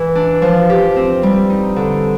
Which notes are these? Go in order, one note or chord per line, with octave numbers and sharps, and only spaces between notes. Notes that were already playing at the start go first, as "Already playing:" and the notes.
Already playing: E3
D4
F3
G4
C4
G3
D#4
D3